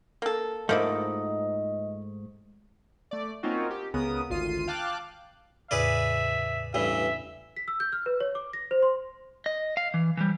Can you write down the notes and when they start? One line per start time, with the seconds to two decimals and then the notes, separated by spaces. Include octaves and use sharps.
0.22 A#3 A4
0.69 G#2 F3 A3 A#3 E4 D#5
3.11 A3 D5
3.43 A#3 C4 C#4 D#4 F4 F#4
3.70 G4
3.94 C#2 C#3 B3 A#4 D#6
4.29 G#1 D2 F4 C7 D#7
4.67 F5 G5 A5 D6 F#6
5.71 E2 A2 C#3 G#4 B4 D5 E5
6.74 A1 G2 E3 E5
7.57 B6
7.68 E6
7.80 G6
7.92 F6
8.06 B4
8.20 C#5
8.35 D6
8.53 A#6
8.71 C5
8.82 C6
9.46 D#5
9.77 F5
9.94 E3
10.17 E3 G3